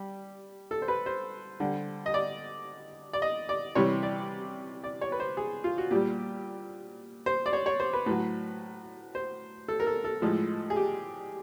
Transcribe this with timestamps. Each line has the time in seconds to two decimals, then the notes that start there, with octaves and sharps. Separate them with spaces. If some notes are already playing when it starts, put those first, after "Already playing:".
Already playing: G3
0.71 A4
0.82 C5
0.88 B4
1.06 C5
1.60 D3 G3
2.06 D#5
2.14 D5
3.13 D5
3.22 D#5
3.49 D5
3.75 C3 E3 G3 C#5
4.03 D5
4.84 D5
5.01 C#5
5.12 B4
5.20 C5
5.37 G#4
5.64 F4
5.78 F#4
5.91 A#2 G3 G4
7.26 C5
7.46 D5
7.53 C#5
7.66 C#5
7.80 C5
7.93 B4
8.06 A2 F#3 B4
9.15 C5
9.68 A4
9.80 A#4
9.87 A4
10.04 A4
10.22 A2 F3 G#3
10.70 G#4
10.76 G4